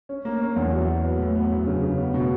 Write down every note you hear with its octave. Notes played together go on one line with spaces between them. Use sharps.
C#4
A#3
C#4
E2
F#3
F#3
B3
A2
B3
F#2
C#3
C#3
B3
B2